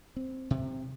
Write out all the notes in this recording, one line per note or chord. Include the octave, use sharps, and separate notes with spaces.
C4
C3